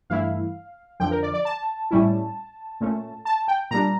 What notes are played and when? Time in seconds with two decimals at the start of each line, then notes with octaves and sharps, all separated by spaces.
0.10 G2 E3 A3 E4 F5
1.00 F2 D3 F3 G5
1.11 A#4
1.23 D5
1.34 D5
1.45 A5
1.91 A2 G3 C#4 E4
2.81 A#2 A3 C#4
3.25 A5
3.48 G5
3.71 A#2 G3 D4 A#5